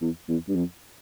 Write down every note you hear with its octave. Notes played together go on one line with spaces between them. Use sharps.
E2
E2
G2
F2